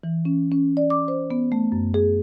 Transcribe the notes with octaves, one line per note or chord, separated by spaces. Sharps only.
E3
C#4
C#4
D5
D6
C5
B3
A3
F#2
G#4